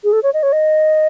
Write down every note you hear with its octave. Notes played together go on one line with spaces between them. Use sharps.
G#4
A4
C#5
D#5
C#5
D#5